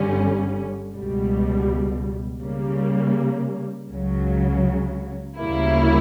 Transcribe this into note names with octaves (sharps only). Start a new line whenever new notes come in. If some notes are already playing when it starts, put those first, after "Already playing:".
Already playing: G1 G2 D3 G3 C#4
C#2 B2 G3
C#3 G3 A#3
C#2 C#3 F#3
D2 C#3 G3 A#3 E4